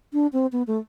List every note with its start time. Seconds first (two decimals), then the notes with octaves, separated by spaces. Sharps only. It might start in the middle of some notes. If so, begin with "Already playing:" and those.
0.13 D4
0.33 C4
0.52 B3
0.67 A3